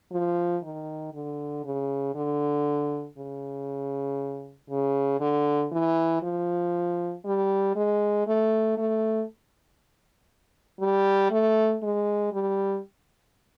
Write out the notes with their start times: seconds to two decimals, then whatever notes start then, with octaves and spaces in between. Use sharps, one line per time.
0.11 F3
0.63 D#3
1.13 D3
1.64 C#3
2.15 D3
3.18 C#3
4.70 C#3
5.20 D3
5.72 E3
6.22 F3
7.25 G3
7.76 G#3
8.27 A3
8.77 A3
10.80 G3
11.31 A3
11.83 G#3
12.33 G3